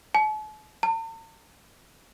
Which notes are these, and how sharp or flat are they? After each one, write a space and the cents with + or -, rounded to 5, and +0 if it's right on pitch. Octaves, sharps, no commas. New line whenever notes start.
A5 -45
A5 +45